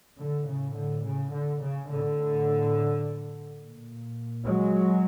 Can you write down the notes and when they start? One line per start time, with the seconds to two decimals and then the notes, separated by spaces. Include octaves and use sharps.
0.18 A2 D3
0.48 C#3
0.76 D3
1.05 C#3
1.32 D3
1.61 C#3
1.89 A2 D3
3.60 A#2
4.45 F#3 G#3